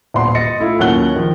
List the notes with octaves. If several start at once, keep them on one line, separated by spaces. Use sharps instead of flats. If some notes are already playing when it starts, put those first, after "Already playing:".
D#1 B3 D5 F#5 C6
D#5 A6 A#6 C#7
A3 E4 F4
D#2 F#3 C#4 F#5 F#6 G7
D#3 F3